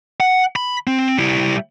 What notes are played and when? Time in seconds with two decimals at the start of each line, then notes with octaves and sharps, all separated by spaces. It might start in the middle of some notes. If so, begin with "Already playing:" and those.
0.20 F#5
0.56 B5
0.87 C4
1.18 G3 E4